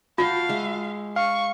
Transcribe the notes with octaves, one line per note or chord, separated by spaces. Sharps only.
F4 F#4 F5 G5 A5
G#3 E5
F5 C#6